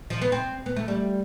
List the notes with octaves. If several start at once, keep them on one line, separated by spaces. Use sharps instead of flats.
F3
B3
C4
B3
A3
G3